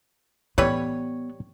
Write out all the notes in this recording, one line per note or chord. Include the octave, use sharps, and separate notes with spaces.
A1 E3 G3 B3 B4 C#5